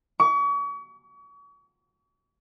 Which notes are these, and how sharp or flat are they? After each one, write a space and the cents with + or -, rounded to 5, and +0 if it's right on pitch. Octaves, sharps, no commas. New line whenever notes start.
C#6 +40